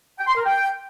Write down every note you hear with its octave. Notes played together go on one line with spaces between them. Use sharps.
G5
C6
A#4
G5